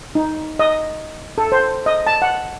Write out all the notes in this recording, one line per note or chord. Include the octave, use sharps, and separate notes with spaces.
D#4
D#5
A4
C5
D#5
A5
F#5